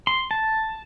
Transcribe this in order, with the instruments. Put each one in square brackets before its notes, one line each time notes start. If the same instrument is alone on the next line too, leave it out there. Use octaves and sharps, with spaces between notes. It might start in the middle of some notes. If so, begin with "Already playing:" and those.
[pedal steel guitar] C6
A5